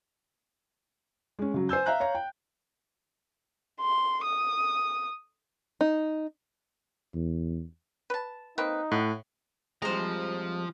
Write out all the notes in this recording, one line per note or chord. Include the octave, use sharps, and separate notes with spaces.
G#3 C#4
C#3 F#3
C5 G#5 E6 G6
E5 F5 A#5 F#6
C#5 F5 A#5
G5
C6
D#6
D#4
E2
B4 A5
A#3 C4 D#4 B4
A2 F#5
F2 F3 G3 G#3 C5 A#5